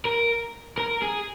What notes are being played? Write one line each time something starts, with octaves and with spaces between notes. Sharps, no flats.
A#4
A#4
G#4